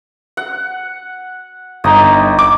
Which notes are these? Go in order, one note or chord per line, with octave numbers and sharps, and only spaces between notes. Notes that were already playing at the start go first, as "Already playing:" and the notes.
F#5
G1 D#4 D#6
D6